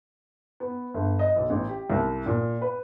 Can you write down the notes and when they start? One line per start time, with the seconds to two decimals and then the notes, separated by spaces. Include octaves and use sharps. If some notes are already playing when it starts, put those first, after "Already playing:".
0.60 B3
0.94 G1
1.19 D#5
1.36 B1
1.50 A1
1.69 G4
1.90 C2
2.26 A#2
2.62 B4